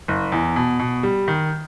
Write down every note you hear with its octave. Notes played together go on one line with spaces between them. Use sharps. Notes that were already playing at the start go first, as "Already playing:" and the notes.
F#1
E2
B2
B2
G3
D#3